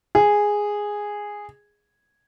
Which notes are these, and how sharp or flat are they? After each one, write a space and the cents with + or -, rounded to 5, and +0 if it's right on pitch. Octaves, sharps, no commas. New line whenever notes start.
G#4 -5